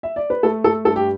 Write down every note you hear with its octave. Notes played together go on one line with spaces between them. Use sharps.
E5
D5
B4
A3 A4
A4
G2 A4
G4